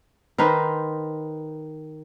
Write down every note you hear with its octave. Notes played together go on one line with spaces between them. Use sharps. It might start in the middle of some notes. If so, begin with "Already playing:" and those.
D#3 D#4 B4 C5